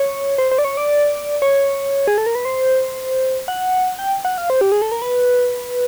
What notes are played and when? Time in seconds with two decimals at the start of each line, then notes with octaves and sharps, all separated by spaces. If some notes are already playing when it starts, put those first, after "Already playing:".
Already playing: C#5
0.38 C5
0.51 C5
0.58 D5
0.65 C#5
0.77 D5
1.42 C#5
2.07 G#4
2.18 A4
2.26 A#4
2.35 B4
2.45 C5
3.48 F#5
3.99 G5
4.25 F#5
4.38 F5
4.50 C5
4.61 G4
4.72 G#4
4.82 A4
4.92 A#4
5.02 B4